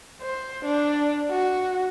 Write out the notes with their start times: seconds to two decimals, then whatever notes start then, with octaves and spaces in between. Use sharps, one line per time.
0.22 C5
0.65 D4
1.30 F#4